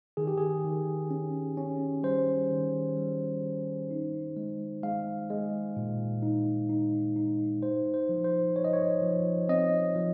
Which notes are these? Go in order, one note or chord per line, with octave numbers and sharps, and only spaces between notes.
D#3 G#4
G4
G#4
D#3
C#4
C#4
G3 C5
D#3
G3
D#3
D#4
G#3
G#3 F5
G#3
A#2
D#4
D#4
D#4
D#4 C5
C5
F3
C5
F3 C#5
D#5
C#5
F3
C4 D#5
F3